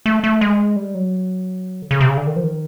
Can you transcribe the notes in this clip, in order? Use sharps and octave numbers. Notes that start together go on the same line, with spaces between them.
A3
A3
G#3
G3
F#3
D3
C#3
C3
C#3
D3
D#3
F3
D#3